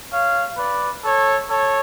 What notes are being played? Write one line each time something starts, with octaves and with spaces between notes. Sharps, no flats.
C#5 F5
B4 D5
A4 C#5
A4 C#5